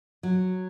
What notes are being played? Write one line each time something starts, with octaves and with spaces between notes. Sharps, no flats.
F#3